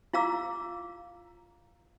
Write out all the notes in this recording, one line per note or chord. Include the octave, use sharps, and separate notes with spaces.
E4 F4 F5 A#5 D6 E6